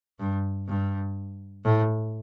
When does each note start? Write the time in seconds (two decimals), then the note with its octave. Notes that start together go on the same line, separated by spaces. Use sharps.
0.19 G2
0.68 G2
1.65 A2